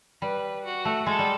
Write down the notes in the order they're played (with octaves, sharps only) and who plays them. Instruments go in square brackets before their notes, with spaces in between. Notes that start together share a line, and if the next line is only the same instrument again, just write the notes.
[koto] G3 [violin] B4
[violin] F#4
[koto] A3
[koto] G#3 [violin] A4
[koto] G3